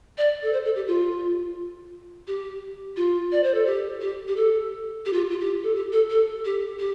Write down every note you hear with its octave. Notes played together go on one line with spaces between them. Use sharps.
D5
A4
C5
A4
G4
F4
G4
F4
D5
C5
A4
G4
G4
G4
A4
G4
F4
F4
G4
A4
G4
A4
A4
G4
G4